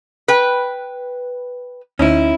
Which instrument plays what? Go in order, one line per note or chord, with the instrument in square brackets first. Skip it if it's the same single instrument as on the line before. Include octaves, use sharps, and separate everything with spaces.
[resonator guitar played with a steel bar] B4 G5
[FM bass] D2 [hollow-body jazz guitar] C#4 D#4 E4